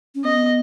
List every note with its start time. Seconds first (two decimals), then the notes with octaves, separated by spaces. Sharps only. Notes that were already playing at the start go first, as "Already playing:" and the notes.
0.15 C#4
0.24 B3 D#5